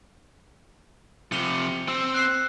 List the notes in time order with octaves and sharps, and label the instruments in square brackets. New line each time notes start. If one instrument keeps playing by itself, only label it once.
[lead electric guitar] C3 F3 [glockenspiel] C#7 F7 G7
[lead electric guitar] C4 [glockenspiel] E6
[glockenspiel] F#6 C7